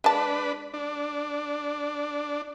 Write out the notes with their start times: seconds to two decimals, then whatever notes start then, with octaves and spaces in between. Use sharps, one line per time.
0.04 G#3 D4 B4 A5
0.74 D4